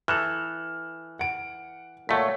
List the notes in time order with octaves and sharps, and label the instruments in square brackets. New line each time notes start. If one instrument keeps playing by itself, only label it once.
[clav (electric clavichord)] E3 A4 [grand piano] F6 F#6 E7
[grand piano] F#5 D7
[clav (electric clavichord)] A#2 A3 [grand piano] C#5 F#5 B6